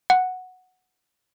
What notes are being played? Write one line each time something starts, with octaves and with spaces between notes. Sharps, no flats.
F#5